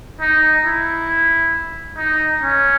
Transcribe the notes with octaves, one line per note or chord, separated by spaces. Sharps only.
D#4
E4
D#4
C#4